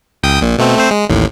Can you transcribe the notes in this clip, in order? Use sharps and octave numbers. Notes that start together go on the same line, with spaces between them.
C#2 G5 D#6
A#1 A#2
B2 A3 C4
A3 C4 C5
G#3
A1 D#2 A2